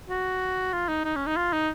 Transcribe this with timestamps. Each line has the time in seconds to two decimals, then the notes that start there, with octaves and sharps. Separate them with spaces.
0.10 F#4
0.73 F4
0.88 D#4
1.04 D#4
1.16 C#4
1.27 D#4
1.37 F4
1.53 D#4